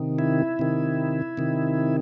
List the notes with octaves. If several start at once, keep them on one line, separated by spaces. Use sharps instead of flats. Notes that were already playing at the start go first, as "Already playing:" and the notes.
Already playing: C3 D#3
E4
C3 D#3
C3 D#3